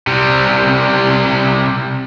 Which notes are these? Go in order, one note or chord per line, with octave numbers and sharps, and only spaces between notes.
C3 G3